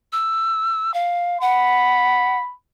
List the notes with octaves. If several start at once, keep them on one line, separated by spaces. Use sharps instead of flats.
E6
F5
F#5 B5